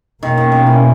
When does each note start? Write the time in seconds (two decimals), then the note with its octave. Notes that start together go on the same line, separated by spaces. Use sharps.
0.22 B2 D#3 A#3 C#4
0.38 D#3
0.52 D#3
0.67 E3